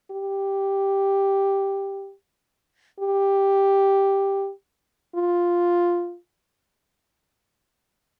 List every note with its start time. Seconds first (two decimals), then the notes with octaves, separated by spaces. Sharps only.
0.11 G4
3.00 G4
5.15 F4